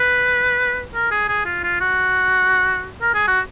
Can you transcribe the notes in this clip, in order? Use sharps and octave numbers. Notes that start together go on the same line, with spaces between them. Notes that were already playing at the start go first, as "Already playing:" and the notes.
Already playing: B4
A#4
G#4
G#4
F4
F4
F#4
A#4
G#4
F#4